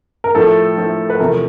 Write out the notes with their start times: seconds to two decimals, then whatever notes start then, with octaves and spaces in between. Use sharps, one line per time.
0.24 A#4
0.35 A2 F3 A3 A4
0.77 A2 F3 A3
1.10 B4
1.19 E2 C3 F3 A3 A#4